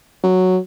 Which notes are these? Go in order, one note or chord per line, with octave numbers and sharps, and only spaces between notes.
F#3